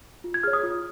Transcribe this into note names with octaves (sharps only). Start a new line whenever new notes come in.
F4
G#6
G#4 C#5 F6
D#6
F4